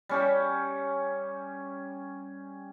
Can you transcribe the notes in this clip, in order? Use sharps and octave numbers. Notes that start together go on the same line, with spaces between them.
G3 C#4 G4